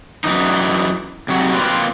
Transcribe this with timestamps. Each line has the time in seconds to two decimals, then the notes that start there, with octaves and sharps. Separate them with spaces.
0.24 F#2 E3 D#4
1.28 C3 F#3 F#4
1.54 A#3 C4 F4 B4